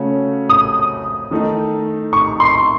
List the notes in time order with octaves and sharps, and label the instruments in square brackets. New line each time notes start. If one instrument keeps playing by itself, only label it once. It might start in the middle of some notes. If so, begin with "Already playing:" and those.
Already playing: [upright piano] C#3 A3 C#4 F#4
[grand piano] D#6
[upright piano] D#3 A3 D#4
[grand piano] C#6
C6